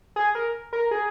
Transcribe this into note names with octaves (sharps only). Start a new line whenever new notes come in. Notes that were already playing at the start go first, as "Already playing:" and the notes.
G#4
A#4
A#4
G#4